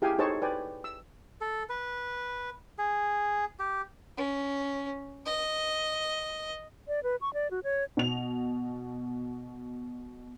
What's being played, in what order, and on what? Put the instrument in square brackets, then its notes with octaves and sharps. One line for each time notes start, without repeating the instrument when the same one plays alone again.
[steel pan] E4 G4 G#4 F5 G5 G#5
D#4 G#4 A4 C5 C#5 A5
B4 D5 G5 G#5
E6
[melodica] A4
B4
G#4
G4
[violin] C#4
D#5
[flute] D5
B4
C#6
D5
F#4
C#5
[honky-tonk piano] B2 F7